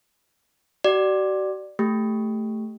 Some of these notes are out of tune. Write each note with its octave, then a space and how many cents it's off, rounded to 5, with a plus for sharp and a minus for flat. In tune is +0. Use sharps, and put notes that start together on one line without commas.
F#4 +45 D5 +10
A3 +0 G4 +0